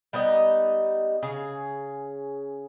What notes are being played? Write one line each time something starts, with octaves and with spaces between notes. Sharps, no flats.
G3 B3 D#4 D#5
C#3 G#4